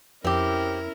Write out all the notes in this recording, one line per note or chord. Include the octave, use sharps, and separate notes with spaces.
F2 C4 C#4 E4 G4 A#4